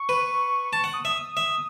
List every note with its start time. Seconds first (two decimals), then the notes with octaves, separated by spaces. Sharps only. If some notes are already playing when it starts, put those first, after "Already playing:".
Already playing: C#6
0.09 B4
0.73 A5 C#6
0.84 F#5
0.94 D#6
1.05 E5
1.15 D#6
1.37 E5